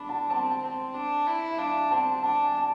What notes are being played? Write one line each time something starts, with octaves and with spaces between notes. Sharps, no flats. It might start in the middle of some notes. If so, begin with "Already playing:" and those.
Already playing: D4 B5
A5
C4 A5
C4
D4
E4
E5
D4 F5
C4 A5
D4 A5
G#5
A5